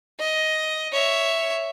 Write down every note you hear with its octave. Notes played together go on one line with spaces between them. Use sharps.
D#5
C#5 E5